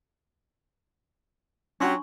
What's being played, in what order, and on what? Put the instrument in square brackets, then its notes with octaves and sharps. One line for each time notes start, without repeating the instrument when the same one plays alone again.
[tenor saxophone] F#3 [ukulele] C#4 F#4 G4 [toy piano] D4 C6 C#6